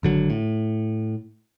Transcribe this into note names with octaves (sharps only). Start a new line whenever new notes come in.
G#1 D3 F#3
A2